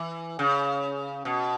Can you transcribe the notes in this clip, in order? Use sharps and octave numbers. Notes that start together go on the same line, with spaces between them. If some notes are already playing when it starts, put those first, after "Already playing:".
Already playing: E3
C#3
B2